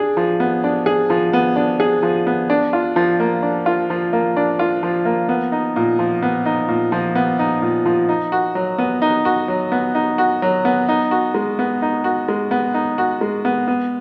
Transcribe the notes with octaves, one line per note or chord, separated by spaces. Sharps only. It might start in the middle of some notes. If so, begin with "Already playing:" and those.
Already playing: D4 G#4
F3
B3
D4
G#4
F3
B3
D4
G#4
F3
B3
D4
F4
F3
A#3
D4
F4
F3
A#3
D4
F4
F3
A#3
B3
D#4
A#2
F3
B3
D#4
A#2
F3
B3
D#4
A#2
F3
D#4
F#4
F#3
B3
D#4
F#4
F#3
B3
D#4
F#4
F#3
B3
D#4
F#4
G#3
B3
D#4
F#4
G#3
B3
D#4
F#4
G#3
B3
B3